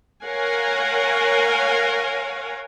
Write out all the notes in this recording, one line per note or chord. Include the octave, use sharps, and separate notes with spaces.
A#4 C#5 F5 F#5 G#5